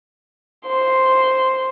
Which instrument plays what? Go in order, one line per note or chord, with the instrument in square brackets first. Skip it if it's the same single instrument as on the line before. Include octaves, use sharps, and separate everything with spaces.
[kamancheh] C5 C6